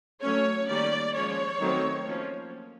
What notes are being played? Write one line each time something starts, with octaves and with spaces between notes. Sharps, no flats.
F#3 A3 C#4 C#5
D#3 G3 A#3 C#4 D5
F3 G#3 C#4 C#5
D#3 F#3 A3 C4
F3 A#3 C#4